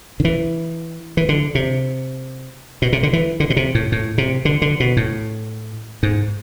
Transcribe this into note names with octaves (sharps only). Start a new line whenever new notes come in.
D3
E3
E3
D3
C3
B2
C3
D3
E3
D3
B2
C3
A2
A2
C3
D3
D3
B2
A2
G#2